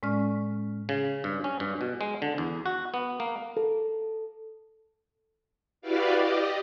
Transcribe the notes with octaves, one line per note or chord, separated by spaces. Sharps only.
A2 G#3 C#4 D5 C#6 F6
C#3
G2
C#4
G2
B2
G#3
D3
E2
F#4
B3
A#3
A4
E4 F#4 G4 B4 D5 F5
G4 D5 D#5